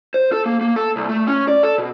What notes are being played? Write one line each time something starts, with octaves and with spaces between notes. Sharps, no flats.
C5
A4
A#3
A#3
A4
C2
A3
C#4
D5
A4
B2